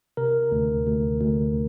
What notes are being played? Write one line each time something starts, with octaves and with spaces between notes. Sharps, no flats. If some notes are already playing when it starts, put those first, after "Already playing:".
C3 A#4
D2
D2
D2